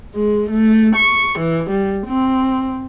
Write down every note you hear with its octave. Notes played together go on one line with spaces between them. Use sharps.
G#3
A3
C#6
E3
G3
C4